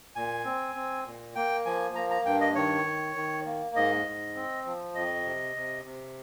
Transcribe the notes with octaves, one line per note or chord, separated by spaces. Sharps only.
A#2 G#5
C4
C4
A#2
A#3 G5
F3 G#5
A#3 A#5
A#5
G2 G5
D#5
D#3 C#5
D#3
D#3
A#3
G#2 D#5
G#2
C4
F3
F2 D#5
C3
C3
C3